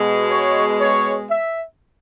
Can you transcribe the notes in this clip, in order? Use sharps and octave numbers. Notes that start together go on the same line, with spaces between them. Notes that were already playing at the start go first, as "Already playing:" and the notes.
Already playing: B2 G#3
C#5
C#5
E5